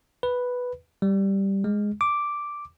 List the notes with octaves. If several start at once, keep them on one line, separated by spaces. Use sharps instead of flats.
B4
G3
G#3
D6